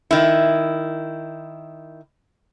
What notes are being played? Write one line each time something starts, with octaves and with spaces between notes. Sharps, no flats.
D#3 E4